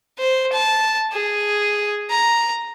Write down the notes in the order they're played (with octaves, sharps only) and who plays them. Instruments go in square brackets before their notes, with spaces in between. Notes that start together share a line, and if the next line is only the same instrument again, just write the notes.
[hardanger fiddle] C5
A5
G#4
A#5